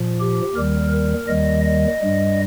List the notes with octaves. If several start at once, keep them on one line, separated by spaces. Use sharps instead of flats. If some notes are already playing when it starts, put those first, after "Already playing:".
Already playing: A#2 F3
G4
D#2 D#3 G3 A#4
A#4
D#2 D#3 G3 D#5
D#5
G2 G3